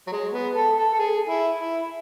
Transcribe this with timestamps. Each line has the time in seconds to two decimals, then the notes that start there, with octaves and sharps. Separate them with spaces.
0.07 F#3
0.12 G#3
0.33 B3
0.55 A4
0.78 A4
0.93 A4
0.99 G#4
1.29 E4
1.58 E4